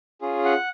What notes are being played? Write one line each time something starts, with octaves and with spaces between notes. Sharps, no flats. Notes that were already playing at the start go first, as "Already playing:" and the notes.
C#4 F4 G#4
F#5